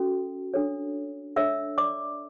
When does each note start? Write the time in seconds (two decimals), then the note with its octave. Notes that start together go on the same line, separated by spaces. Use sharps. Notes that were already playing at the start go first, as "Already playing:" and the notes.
Already playing: C#4 F#4 A4
0.54 D4 A4 C#5
1.36 D4 A4 C#5 E5 E6
1.78 D5 D6